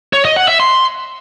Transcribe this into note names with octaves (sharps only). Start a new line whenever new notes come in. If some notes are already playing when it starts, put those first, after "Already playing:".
C#5
D#5
F#5
E5
C6